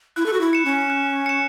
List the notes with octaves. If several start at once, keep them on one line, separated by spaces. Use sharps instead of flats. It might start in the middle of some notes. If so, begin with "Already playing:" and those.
E4 F#6
A4
F#4
E4
C#7 E7
C#4
F#6
C#7 E7